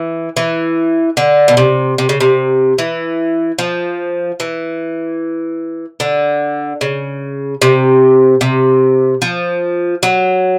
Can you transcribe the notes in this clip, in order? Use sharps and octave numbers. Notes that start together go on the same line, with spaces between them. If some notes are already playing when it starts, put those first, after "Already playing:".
Already playing: E3
E3
D3
B2
C3
C3
C#3
C3
E3
F3
E3
D3
C#3
C3
C3
F3
F#3